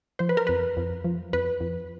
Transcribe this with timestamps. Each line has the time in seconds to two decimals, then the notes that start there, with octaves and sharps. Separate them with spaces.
0.19 F3 C5
0.29 B4
0.37 A#4
0.47 F2 B4
0.77 F2
1.04 F3
1.33 F2 B4
1.61 F2